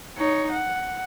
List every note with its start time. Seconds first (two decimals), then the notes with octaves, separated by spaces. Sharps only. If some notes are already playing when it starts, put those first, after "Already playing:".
0.18 D#4 C#5
0.52 F#5